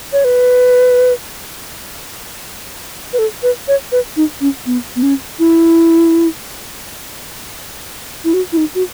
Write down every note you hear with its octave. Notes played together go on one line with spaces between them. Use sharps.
C#5
B4
B4
A4
B4
C#5
B4
D#4
C#4
B3
B3
C#4
E4
E4
F#4
E4
D#4
F#4